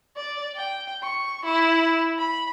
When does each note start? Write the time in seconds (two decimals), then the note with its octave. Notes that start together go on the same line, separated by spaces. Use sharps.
0.17 D5
0.55 G5
1.03 C#6
1.45 E4
2.19 B5